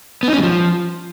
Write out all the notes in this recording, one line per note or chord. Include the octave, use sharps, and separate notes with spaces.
B3
D#4
C#4
G3
F3